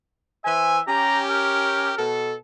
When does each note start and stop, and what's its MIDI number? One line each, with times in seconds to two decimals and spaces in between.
0.45 0.79 52
0.45 0.79 72
0.45 0.81 76
0.45 0.79 80
0.88 1.93 61
0.88 1.93 67
0.88 1.19 82
1.29 2.03 70
1.98 2.35 47
1.98 2.35 69